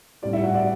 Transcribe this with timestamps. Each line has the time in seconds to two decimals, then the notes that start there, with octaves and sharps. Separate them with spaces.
0.22 A2 G3 C#4 E4 D5
0.33 E4 E5
0.43 F#4 F#5
0.54 D5